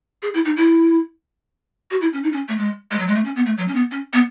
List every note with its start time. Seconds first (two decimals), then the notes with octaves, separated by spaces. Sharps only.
0.22 G#4
0.34 E4
0.45 D#4
0.57 E4
1.91 F#4
2.01 E4
2.13 C#4
2.24 D#4
2.33 C#4
2.48 A3
2.58 G#3
2.91 G#3
2.99 F#3
3.07 G#3
3.15 A3
3.25 C#4
3.36 B3
3.46 A3
3.58 F#3
3.68 C#4
3.75 B3
3.91 C#4
4.13 B3